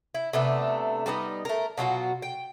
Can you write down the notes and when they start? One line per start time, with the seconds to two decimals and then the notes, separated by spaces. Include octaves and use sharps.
0.14 E4
0.33 C3 A3 B3 D4
1.06 G3 A3 B3 D#4
1.45 A3 A#4
1.77 B2 F#3 F4 F#4
2.22 G5